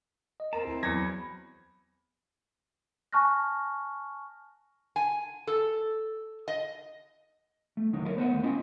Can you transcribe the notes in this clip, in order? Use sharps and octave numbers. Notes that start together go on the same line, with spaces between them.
D#5
C4 A#4 A5 A#5
D2 E4
E2 F#3 G#6 A#6 C#7
B5
G#5 A5 C#6 F6 F#6 A#6
G#5
A4
D#5
A3
D#2 D3 F#3 D#4
E4 A#4 C#5
B3 C5 D#5 F#5
D#2 A3
C4 C#4 E4 F4 D#5